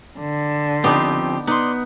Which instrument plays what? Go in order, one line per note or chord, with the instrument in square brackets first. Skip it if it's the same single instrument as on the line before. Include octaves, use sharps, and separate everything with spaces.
[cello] D3
[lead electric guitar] F3 C4 [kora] B3 D#4 B4 [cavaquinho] G4
[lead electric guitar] B3 [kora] D#4 [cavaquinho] D5 C6